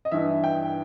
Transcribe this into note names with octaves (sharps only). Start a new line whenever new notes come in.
D#5
G2 E3 E5
G5